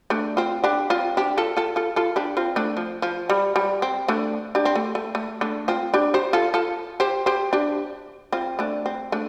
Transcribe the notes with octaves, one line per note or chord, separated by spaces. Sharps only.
A3 D4
C4 F4
D4 G4
C4 F4
D4 G4
F4 A4
F4 A4
F4 A4
F4 A4
D4 G4
C4 F4
A3 D4
F3
F3
G3
G3
C4
A3 D4
D4 G4
C4
A3
A3
A3
A3 D4
C4 F4
D4 G4
G4 C5
F4 A4
F4 A4
G4 C5
G4 C5
D4 G4
C4 F4
A3 D4
C4
A3 D4